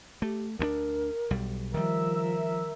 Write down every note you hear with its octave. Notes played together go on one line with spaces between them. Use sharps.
A3 G4
D2 G3 D4 A#4
B1 G3
D#3 F3 G3 A#4 E5